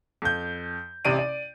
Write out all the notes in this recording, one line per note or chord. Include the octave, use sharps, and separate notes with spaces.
F2 G6
A1 C3 D5 D7 D#7
D5